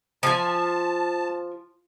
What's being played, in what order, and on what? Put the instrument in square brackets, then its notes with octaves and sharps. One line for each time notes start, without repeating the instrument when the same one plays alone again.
[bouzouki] F3 G#5 [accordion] A5